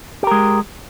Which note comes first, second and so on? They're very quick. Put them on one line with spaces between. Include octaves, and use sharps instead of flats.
G4 A#4 G#3